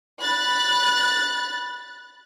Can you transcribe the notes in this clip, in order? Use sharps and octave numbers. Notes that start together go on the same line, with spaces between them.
B5 F#6 A6